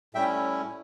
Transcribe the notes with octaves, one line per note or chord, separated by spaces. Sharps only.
A2 G3 C#4 E4 E5 G5